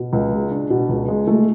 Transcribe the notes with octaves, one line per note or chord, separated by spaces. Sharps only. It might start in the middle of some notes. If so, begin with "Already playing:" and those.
Already playing: B2
C#2
G#3
D4
B2
C#2
G#3
A3